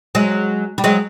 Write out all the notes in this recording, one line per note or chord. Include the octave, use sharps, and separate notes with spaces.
F#3 G#3
G3
F#3 G#3